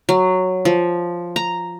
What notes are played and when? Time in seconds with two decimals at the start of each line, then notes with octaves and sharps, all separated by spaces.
0.09 F#3
0.65 F3
1.36 A#5